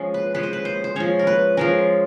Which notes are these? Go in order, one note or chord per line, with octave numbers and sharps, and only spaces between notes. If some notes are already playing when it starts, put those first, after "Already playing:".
Already playing: F3 G#3 C#4
B4
F3 G#3 C#4 B4
C5
B4
C5
C5
F3 G#3 C#4 C#5
A#4
B4
F3 G#3 C#4 A#4